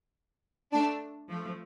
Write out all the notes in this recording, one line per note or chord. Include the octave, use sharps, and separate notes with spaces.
A3 D4
F3 A3